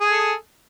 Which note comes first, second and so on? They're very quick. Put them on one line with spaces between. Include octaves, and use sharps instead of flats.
G#4 G#5 A4